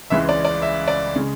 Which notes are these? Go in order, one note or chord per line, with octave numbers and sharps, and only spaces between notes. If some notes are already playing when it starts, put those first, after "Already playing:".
C#2 C#3 E3 G#3 E5
D5
D5
E5
D5
C#3 G#3